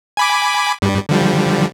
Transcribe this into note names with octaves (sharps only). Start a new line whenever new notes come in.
G#5 B5 D6
G2 G3
D3 F3 G3